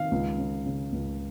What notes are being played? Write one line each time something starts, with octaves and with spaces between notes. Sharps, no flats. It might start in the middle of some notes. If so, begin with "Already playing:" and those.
Already playing: D#3 F5
C#2
C#3
C#3
C#2